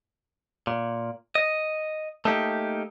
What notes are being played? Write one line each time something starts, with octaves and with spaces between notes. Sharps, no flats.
A#2
D#5
A3 A#3 D#4 G4